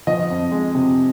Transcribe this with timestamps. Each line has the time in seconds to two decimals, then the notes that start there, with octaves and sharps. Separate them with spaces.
0.07 F3 D#5
0.30 F2
0.52 G#3
0.75 C3